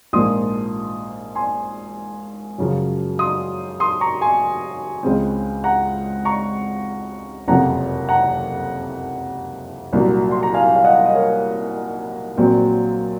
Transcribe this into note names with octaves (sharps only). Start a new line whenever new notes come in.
A#1 G#2 F3 A#3 C6 D#6
G#5 C6
F#2 C#3 F3
C6 D#6
C6 D#6
A#5 C#6
G#5 C6
C#2 C#3 G#3 C4
F#5 A#5
A#5 C#6
F#1 F2 C3 F3 F#5 A#5
F#5 A#5
C2 A#2 F#3
C6
A#5
F5 G#5
F5
D#5 F#5
D#5
A#4 C#5
A#1 A#2 F#3 C4